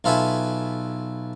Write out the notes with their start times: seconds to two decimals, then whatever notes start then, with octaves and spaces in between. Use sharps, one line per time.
0.04 B1 F4 A4 B4 E5 G#5